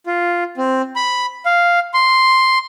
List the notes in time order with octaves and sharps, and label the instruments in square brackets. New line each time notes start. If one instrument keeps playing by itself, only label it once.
[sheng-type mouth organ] F4
C4
B5
F5
C6